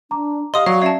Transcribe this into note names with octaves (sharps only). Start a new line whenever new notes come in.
D4 A#5 D6
G4 D#5 F5 C6 D#6
F#3 D5 F5 C#6
C#4 D5 E5 A5 G#6 C7